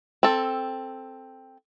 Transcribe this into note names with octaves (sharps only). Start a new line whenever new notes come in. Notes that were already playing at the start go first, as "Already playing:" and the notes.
C4 A4